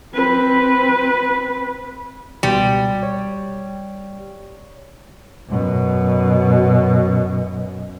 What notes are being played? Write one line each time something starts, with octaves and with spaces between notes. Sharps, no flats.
C4 B4
C#2 B2 G3
C#5
F#2 B2